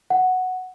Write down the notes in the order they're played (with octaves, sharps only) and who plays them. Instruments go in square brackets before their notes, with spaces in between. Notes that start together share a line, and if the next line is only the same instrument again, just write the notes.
[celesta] F#5